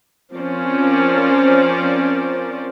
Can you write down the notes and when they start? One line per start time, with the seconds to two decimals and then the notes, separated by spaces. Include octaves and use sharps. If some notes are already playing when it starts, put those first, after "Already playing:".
0.33 F3 C4 C#4 A#4 C5 D5